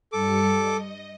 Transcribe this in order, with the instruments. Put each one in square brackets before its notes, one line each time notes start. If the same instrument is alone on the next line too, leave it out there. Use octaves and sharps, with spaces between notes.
[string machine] G2 G3 C#7 [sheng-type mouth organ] A4 D6
[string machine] D#5